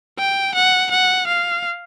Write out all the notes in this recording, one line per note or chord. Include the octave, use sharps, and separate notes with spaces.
G5
F#5
F#5
F5